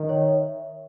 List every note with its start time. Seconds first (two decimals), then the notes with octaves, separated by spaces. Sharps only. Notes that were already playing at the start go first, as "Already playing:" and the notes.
Already playing: D#3
0.09 C#5
0.31 E5